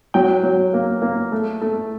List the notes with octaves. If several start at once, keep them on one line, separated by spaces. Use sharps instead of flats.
F#3 G5
F#3
A#3
A#3
A3
A3